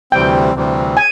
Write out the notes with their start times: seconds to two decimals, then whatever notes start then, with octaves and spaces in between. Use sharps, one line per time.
0.12 D2 C3 E3 G3 C4 G5
0.54 D2 C3 E3 G3 C4
0.97 G#5